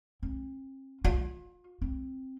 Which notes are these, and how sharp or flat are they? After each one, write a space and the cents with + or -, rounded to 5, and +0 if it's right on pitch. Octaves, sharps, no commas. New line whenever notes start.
C4 +40
F4 +35
C4 +10